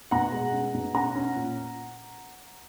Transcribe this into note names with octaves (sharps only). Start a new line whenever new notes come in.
B2 F#5 A#5
G#3
C#4
B2
C#4 F#5 A#5
C#4
A#2